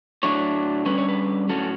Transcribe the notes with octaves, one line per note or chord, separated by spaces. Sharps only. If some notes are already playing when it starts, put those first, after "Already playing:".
A2 F#3 A3 D4 C#5
D3 G3 C#4 B4
C#5
B4
A2 F#3 C#4 A4